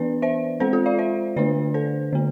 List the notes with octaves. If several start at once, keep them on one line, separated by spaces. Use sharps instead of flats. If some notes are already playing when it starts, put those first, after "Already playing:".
Already playing: E3 B3 D4 B4 D5
C5 E5
G#3 C4 A4 C5
F4 A4
D5 F5
C5 E5
D3 A3 D4 B4 D5
A4 C5
D3 A3